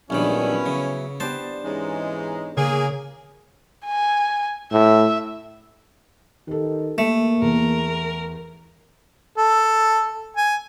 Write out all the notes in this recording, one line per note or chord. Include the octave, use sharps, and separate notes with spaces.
A#1 G2 D#3 F#3 B3 C#4 E4
C#3
B3 D4 G4 C5 A5
G#2 E3 G#3 C#4 D#4
C#3 A#3 G#4
G#5
A2 E5
D#3 G4 A4
A3 A#3
E2 A#4
A4
G#5